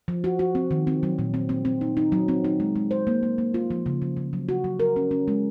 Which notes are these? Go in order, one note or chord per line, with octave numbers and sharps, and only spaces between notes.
F3
F#4
F#4
C4
D#3
C4
F#3
A#2
C4
C4
C4
D#4
D#4
F#3
C4
D#4
G#3
G#3
C5
A#3
A#3
A#3
F4
F3
C#3
F3
C#3
F#3
F#4
F#3
A#4
C#4
C#4
G#3